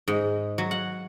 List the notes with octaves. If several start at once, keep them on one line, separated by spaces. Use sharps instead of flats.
G#2
F#3
F#5